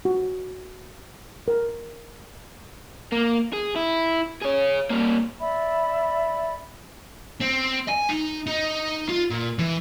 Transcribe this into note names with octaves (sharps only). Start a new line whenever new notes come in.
F#4
A#4
A#3
G#4
E4
G#4 C#5
G3 A#3
D5 E5 B5
C4
G#5
D#4
D#4
F4
A#2
E3